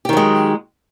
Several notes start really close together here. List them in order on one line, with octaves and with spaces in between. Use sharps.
G4 D#3 F#3 G#3